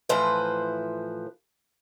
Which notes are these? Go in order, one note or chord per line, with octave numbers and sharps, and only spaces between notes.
A2 E3 F3 B4 C5